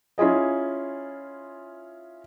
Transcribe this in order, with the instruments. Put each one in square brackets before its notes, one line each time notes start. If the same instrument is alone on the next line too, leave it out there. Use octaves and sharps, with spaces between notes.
[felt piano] C#4 E4 F4 G#4 D#5